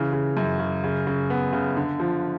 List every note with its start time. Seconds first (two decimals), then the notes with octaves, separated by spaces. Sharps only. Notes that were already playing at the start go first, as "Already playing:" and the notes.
Already playing: C#3 E3
0.13 C#3
0.37 F#2
0.59 C#3
0.84 C#3
1.07 C#3
1.30 B3
1.53 C#3
1.77 D3
2.00 F3